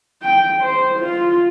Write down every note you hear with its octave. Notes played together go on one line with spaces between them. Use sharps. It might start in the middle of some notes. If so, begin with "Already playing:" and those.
G5
C5
F4